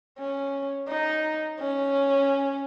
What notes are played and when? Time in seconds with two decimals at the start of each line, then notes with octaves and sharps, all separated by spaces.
0.18 C#4
0.89 D#4
1.60 C#4